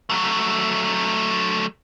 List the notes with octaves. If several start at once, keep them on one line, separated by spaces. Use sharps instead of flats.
F#3 A3